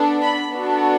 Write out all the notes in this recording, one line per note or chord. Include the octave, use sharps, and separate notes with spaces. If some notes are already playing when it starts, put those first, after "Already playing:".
Already playing: B3 D4 A4
B5
B3 D4 F#4 A4